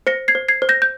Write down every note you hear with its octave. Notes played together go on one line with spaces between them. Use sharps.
C5 A#6 C#7
G#6 C7
C5
G#6 C7
C5
G6 A#6
G6